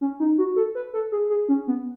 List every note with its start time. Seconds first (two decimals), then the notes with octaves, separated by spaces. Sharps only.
0.01 C#4
0.20 D#4
0.38 F#4
0.56 A4
0.75 B4
0.94 A4
1.12 G#4
1.30 G#4
1.49 C#4
1.67 B3